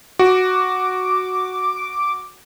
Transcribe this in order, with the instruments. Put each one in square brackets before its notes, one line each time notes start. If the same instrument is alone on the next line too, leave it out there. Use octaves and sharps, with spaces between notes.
[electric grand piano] F#4 [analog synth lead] D6